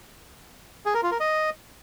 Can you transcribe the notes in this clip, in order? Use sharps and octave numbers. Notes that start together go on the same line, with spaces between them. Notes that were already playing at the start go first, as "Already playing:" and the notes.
G#4
A#4
F4
A#4
D#5